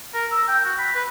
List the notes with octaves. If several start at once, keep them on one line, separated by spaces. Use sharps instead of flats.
A#4
E6
G5
F#4
B5
B4